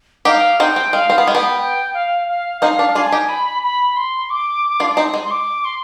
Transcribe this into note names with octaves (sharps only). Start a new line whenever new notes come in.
D#4 G4 F5
C4 D#4 G5
C4
G#3 F5
C4
B3
G#3 G5
B3
G5
F5
F5
C4 D#4 F5
D4
D4 F4 G#5
D#4 G4
B5
B5
C6
D6
D4 F4
C4 D#4
G#3
C6
D6
C6